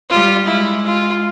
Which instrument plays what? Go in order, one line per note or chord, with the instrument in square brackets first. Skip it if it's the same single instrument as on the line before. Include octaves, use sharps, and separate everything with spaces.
[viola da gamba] G3 [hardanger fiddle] F4
[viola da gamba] G#3 [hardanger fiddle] E4
[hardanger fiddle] F4